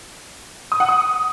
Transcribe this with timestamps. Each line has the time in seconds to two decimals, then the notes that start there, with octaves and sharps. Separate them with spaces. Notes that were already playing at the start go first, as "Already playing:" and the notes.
0.72 D#6
0.80 F#5
0.89 D#6